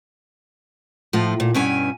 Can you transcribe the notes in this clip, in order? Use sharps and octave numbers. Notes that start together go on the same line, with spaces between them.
A2 F3 F4
A#2
G2 B2 C#4 E4 G5 G#5